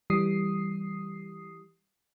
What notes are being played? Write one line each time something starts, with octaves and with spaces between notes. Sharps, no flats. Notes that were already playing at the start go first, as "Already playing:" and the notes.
E3 G3 D#6 C7